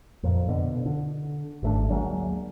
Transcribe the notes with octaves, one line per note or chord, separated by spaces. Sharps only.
F2 A#2
B2 D3
D3
G#1 A3 D4
D2 F#3 G#3 A#3